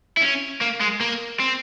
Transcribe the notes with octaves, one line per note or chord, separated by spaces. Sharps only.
E4
C#4
A#3
G#3
A#3
C4